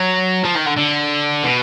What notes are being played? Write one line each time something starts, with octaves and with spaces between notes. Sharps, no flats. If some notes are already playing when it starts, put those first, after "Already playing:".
Already playing: F#3
F3
D#3
D3
D3
B2